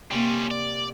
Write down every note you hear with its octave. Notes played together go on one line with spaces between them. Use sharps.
C3 G3 A#3 C#4
D5